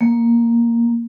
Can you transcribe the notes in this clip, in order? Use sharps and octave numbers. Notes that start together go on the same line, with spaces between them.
A#3